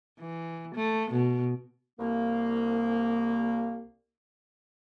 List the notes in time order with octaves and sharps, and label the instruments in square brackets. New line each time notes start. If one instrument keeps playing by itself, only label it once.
[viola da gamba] E3
A3
B2
[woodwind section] C2 A#3